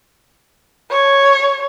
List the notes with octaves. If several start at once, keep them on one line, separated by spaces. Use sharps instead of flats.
C#5